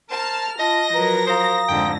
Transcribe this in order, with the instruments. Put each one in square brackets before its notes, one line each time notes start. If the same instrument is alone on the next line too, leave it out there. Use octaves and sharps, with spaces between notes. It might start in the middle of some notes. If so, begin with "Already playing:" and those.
[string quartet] A#4 F6 [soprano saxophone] C5 [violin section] A5
[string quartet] F4 [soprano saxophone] D#5 [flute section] A5 [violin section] A#6
[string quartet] F3 F#3 A#4 [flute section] B4 A#5
[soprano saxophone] C5 [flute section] F5 A#5 D#6
[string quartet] F2 G#2 D3 [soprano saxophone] G5